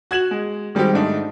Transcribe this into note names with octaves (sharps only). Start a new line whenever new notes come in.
F#4 G#6 E7 F#7
G#3
D#3 G3 G#3 C4 G4
G#2 A3 D4 D#4